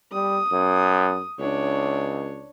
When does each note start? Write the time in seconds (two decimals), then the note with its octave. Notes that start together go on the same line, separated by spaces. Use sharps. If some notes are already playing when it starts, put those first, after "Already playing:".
0.12 G3 D#6
0.52 F#2
1.39 C#2 D4 C#5